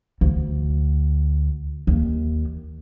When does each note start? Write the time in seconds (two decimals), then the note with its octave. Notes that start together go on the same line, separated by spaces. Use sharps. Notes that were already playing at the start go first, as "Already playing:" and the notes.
0.21 D2
1.87 D#2